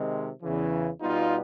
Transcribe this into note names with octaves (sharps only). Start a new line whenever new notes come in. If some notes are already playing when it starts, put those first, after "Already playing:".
Already playing: C3 D#3 G#3 C4
E2 C#3 E3
B2 G3 B3 D#4 F4